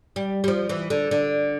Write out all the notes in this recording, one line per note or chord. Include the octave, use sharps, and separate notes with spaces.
G3
G3
F3
E3
D3
D3